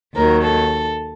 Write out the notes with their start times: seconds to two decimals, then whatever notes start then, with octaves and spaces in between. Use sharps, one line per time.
0.15 D#2 D#3 F#3 A#4
0.44 A4